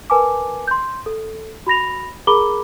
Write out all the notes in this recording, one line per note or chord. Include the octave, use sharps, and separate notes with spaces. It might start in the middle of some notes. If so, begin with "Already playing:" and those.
A#4 B4 G#5 A5 D6
C6 G6
A4
F#4 B5 A#6 F7
G#4 A#4 A#5 B5 D6 G7